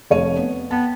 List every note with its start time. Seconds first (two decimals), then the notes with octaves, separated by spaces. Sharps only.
0.10 F1 C#5 D#7
0.37 B3
0.71 B3 G5 A5